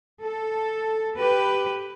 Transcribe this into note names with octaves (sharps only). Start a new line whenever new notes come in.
A4
G4 B4